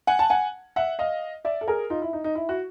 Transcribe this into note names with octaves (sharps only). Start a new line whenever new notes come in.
F#5 G#5
A5
F#5 G#5
E5 F#5
D#5 F5
D5 E5
A4
G#4 A#4
D#4 F4
E4
D#4
D#4
E4
F#4